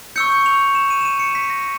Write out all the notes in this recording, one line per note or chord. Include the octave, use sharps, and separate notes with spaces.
C#6 E6 G6 C#7
F7
E7
D#7
E7
D#7
C#7
B6
A#6